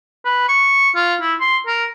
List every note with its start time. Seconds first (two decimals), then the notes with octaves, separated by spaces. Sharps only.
0.25 B4
0.49 C#6
0.95 F4
1.21 E4
1.41 C6
1.67 A#4